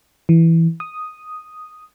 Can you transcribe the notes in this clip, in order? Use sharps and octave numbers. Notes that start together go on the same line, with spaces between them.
E3
D#6